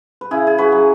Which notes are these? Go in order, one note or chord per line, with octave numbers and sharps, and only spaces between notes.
B4
C#3 E4 G#4
G#4
F#4 B4
F#3